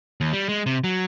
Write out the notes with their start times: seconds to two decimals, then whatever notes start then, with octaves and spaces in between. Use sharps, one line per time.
0.21 D#2
0.33 G3
0.49 G#3
0.66 C3
0.84 F#3